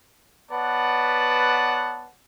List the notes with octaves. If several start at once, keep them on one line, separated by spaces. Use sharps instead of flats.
B3 B4 C#5 D5 F#5 A5